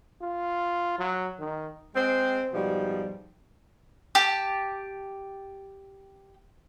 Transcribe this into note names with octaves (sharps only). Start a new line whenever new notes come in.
F4
F#3
D#3
G#3 C4
G#2 B2 F3 G3
G4 A5